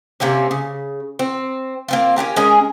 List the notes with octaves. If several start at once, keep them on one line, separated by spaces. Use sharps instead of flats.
C3 A#3 C4 C#4
C#3
C4
A#3 C4 F4
C#4 D4 G4 A#4
G#3 C#4 G#4 A#4